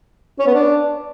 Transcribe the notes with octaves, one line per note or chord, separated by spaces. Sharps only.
C#4
B3
D4